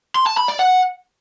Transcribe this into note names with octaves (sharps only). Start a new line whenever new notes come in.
C6
A5
B5
D5
F#5